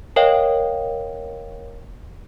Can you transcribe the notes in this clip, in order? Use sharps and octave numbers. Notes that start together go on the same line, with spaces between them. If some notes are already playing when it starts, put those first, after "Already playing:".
A#4 C#5 D#5 F5 G5